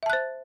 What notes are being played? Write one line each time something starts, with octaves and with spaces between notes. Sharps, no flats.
C5 E5 A5 F#6